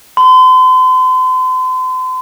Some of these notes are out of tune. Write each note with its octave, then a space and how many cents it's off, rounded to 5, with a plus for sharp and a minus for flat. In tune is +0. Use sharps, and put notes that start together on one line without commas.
C6 -40